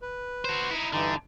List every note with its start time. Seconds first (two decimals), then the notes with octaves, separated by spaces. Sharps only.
0.02 B4
0.45 F#4 C5
0.71 D#4 E4
0.93 G2 D3 E3 D#4